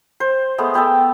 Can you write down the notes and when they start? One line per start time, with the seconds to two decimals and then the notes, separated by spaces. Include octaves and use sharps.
0.20 C5
0.58 G#3 A3 B3
0.74 B3 G5 A5 E6